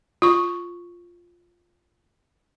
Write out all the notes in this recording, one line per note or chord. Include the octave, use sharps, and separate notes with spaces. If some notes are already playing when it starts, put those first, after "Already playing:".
F4 C#6